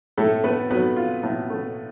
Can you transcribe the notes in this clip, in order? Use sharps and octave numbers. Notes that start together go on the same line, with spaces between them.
A2 A3 A4
A3 B3 B4
F#3 B3 B4
F4
A2
A3